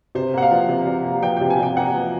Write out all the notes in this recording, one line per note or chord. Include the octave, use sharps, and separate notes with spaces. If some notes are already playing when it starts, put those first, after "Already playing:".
C3 C5
A#3 F#5
F5
F3
C3
C3
A#3
F3 G5
G5
C3
G#5
C3 G5
A#3 F#5
F3